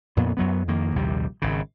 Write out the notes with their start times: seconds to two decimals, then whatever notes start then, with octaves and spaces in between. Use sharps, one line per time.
0.17 F2 A#2 B3
0.37 F#2 F#3 B3
0.68 F2 D#3 A#3
0.96 A#1 D#2 C3 G3
1.42 G#1 C#3